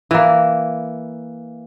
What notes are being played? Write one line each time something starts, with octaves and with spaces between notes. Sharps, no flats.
E3 A#3